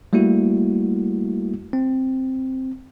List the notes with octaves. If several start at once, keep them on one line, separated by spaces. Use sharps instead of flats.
G3 A3 A#3 E4 F#4
C4